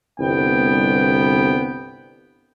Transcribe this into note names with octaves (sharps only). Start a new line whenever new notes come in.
G1 C2 B3 G5